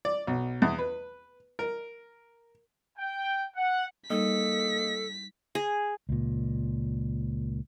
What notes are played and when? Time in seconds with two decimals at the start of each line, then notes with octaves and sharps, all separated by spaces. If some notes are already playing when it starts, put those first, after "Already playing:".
0.05 D5
0.27 B1
0.62 E2
0.79 B4
1.59 A#4
2.98 G5
3.55 F#5
4.10 G3 A#3 D#4 A4 D#5 D#6 B6
5.55 G#4
6.09 C#2 A#2